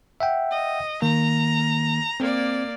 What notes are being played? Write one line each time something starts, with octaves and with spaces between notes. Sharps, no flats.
E5 F#5 G5
D#5
D#3 A#3 A#5
A#3 C4 D5